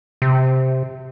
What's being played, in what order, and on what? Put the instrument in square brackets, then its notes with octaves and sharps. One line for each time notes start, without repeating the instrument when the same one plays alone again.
[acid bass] C3